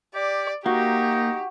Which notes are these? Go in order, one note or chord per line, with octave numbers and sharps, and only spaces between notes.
G4 D5
A#3 D#4 F#4 G4